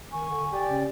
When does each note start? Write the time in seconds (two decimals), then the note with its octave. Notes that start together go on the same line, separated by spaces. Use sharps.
0.12 D#3 G#5 C#6
0.29 D3
0.52 G4 D5
0.68 C#3